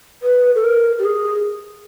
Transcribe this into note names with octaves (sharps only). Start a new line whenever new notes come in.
B4
A4
A#4
G4
G#4